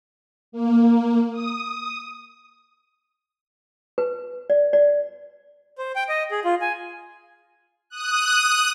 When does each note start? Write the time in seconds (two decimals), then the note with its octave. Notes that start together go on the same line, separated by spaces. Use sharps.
0.52 A#3
1.32 D#6
3.98 B4
4.50 D5
4.73 D5
5.78 C5
5.96 G5
6.09 D#5
6.31 G#4
6.45 F4
6.61 G#5
7.90 D#6 F#6